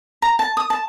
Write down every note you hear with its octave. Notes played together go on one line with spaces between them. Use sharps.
A#5
A5
D#6
A5